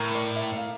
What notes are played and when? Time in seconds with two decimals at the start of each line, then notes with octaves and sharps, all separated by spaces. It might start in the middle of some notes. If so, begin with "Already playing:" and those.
Already playing: A2 A#4
0.15 D5
0.36 E5
0.57 F5